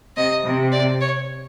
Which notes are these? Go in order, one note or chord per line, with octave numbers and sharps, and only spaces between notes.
C3 D#5
C3
D5
C#5